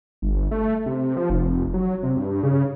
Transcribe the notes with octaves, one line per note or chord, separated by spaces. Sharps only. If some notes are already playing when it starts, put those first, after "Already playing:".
G1
A3
C3
F3
F1
F#3
C3
G2
C#3